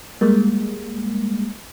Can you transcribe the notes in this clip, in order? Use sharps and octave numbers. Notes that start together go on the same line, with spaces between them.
G3 G#3 A#3